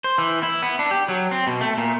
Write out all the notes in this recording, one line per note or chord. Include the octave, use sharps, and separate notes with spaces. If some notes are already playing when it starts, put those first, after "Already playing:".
C5
E3
E4
B3
D4
G4
F#3
C4
B2
A3
A#2